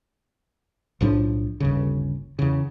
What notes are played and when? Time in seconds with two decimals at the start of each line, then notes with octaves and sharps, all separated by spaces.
1.01 B1 A2 F3 D4
1.60 G1 D#2 C#3
2.39 E2 C#3